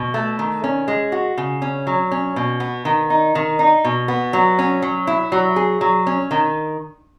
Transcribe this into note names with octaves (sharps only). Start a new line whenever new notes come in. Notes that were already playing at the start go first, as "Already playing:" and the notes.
Already playing: B2
A3
D#3
C#4
G#3
F#4
C#3
C#4
F#3
C#4
B2
B3
D#3
D#4
D#3
D#4
B2
B3
F#3
C#4
F#3
E4
F#3
G#4
F#3
C#4
D#3